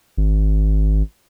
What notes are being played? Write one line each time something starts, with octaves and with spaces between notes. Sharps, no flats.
G#1